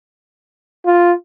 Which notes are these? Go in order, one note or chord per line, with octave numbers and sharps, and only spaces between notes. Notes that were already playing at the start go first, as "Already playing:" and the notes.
F4